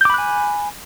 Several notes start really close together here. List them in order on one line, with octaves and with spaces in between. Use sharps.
G6 D6 B5 F#6 G#5